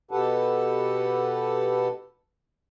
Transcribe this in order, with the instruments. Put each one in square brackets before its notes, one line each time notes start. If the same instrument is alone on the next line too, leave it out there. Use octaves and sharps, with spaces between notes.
[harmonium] B2 G4 A4 B4 F#5 A5